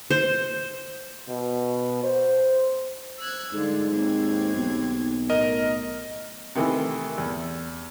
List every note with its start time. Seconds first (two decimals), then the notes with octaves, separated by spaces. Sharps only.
0.10 C5
1.29 B2
2.04 C5
3.18 E6 F#6 G#6
3.53 G#2 D3 G3 F4
3.92 D#2 C4 G#6
4.55 B1
5.30 A2 A#4 D#5
6.55 C3 D#3 E3 A3 E4
7.18 E2